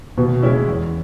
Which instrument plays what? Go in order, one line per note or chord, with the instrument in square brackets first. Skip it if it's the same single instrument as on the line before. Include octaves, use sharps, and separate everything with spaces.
[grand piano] D#2 [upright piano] B2
[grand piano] C#3 G#3 C#4 E4
E2